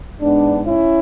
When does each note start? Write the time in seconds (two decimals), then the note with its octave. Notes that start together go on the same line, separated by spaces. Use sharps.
0.21 G#2 G#3 B3 D4
0.65 C#4 E4